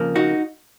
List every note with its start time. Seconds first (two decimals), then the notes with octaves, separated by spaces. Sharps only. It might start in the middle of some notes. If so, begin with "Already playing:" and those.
Already playing: F2 C#3 F3 A#3
0.15 D#4 F#4